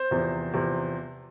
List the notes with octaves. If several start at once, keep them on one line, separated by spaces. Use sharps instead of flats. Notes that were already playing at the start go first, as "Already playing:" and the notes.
Already playing: C5
E2 C3 F3
E2 C3 F3